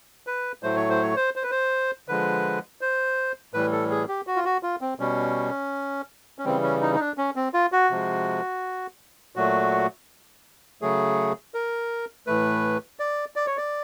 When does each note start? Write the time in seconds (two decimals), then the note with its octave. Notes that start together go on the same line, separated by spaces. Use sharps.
0.27 B4
0.63 A2 F#3 A3 C5
0.76 C#5
0.90 C5
1.03 C#5
1.16 C5
1.36 C5
1.43 B4
1.51 C5
2.08 D3 F3 G#3 B4
2.81 C5
3.54 A2 E3 G3 B4
3.72 A4
3.90 G#4
4.08 G4
4.27 F#4
4.36 F4
4.45 F#4
4.63 F4
4.81 C4
4.99 B2 G3 C#4
6.39 C#4
6.45 C#3 E3 G3 C4
6.63 C#4
6.81 D#4
6.95 D#4
7.00 D4
7.18 C#4
7.36 C4
7.54 F4
7.72 F#4
7.90 C3 F3 G#3
9.36 A#2 F#3 A3 F#4
10.82 C#3 F#3 A3 G#4
11.54 A#4
12.27 A2 E3 A3 B4
12.99 D5
13.36 D5
13.47 C#5
13.57 D5